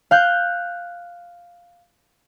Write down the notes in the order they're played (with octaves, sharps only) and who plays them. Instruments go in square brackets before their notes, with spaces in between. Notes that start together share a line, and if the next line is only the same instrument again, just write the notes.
[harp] F5 F#6 G6